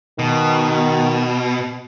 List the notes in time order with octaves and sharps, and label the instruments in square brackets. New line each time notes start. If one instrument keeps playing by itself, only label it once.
[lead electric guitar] B2 [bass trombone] D#3